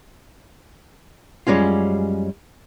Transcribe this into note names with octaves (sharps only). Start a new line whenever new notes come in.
F#2 G3 G#3 C#4 F4